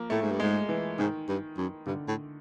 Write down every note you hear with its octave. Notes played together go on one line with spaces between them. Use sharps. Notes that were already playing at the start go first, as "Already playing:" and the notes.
Already playing: F3 A#3
A2 A3
G#2
G2
G#2 G#3
E3
G#2 D#3
G2
F#2
G2 D3
A2